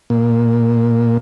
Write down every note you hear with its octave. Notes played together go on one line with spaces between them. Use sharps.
A#2